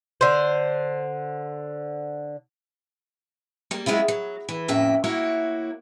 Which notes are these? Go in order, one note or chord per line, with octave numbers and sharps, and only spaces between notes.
D3 C5
G3 A#3
F#3 G#3 C4 E4 F4
F#3
E3
F2 A2 C#3 A#3 E5
A#3 E4 F#4 C#5